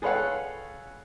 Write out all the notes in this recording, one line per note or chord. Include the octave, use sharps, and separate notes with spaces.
G#4 A4 B4 C#5 F5 F#5